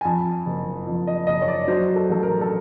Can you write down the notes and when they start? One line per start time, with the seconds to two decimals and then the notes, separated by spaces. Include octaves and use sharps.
0.01 G#5
0.05 F2 A5
0.46 F#1
0.87 F2
1.07 D#5
1.27 F#1 D#5
1.42 C#5
1.48 D5
1.68 F#3 C5
1.96 A4
2.09 A1 A4
2.23 A#4
2.41 A4